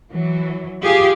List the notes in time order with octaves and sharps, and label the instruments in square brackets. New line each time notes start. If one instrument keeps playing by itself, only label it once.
[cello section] E3 F#3
F4 G4 G#4